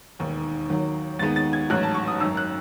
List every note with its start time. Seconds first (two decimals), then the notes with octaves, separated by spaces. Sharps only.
0.19 E1 D#2 D#3
0.70 D#2 D#3 F#3
1.19 D#2 D#3 G#3 B3 A6
1.36 A6
1.53 G#6
1.70 A1 G#2 F#3 F#6
1.83 A5
1.94 C#6
2.08 D#6
2.20 G#1 F#2 D#3 E6
2.37 F#6